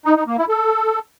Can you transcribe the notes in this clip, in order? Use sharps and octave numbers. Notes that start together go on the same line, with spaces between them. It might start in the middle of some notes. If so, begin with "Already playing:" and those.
D#4
D#4
A#3
E4
A4